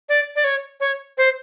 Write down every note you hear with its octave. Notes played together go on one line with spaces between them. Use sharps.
D5
D5
C#5
C#5
C5